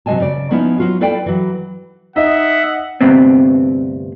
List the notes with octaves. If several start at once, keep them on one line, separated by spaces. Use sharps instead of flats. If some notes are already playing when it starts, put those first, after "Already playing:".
C3 F#3 G#3 D#5 G#5 A5
C#3 D5
F3 B3 C#4 D#4 E4
F#3 F4 F#4
E4 A4 B4 D5 F5 G5
E3 F#3
D#4 D#5 E5 F#5
D2 G2 C3 B3 C4